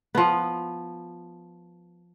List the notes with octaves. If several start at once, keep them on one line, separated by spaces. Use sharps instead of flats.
F3 B3